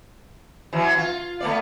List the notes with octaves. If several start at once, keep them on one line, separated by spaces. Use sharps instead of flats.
E3 F#3
F4
A3 B3 D5